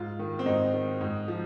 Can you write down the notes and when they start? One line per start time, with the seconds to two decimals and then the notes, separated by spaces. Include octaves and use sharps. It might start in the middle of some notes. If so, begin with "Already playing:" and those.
Already playing: G#2 F4
0.19 D#3
0.39 C4
0.46 G#2 D#4
0.74 D#3
1.01 G#2
1.28 F3